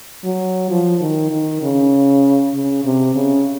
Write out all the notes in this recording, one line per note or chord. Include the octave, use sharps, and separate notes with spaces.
F#3
F3
D#3
D#3
C#3
C#3
C3
C#3